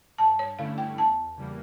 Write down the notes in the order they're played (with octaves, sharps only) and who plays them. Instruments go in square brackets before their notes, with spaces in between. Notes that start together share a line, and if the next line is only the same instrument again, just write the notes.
[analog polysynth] G2 [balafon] A5
[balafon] C#5
[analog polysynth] D3 A3 C#4 E4 [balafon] F5
[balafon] G5
[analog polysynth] E2 [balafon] A5
[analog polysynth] C#3 E3 G3 A#3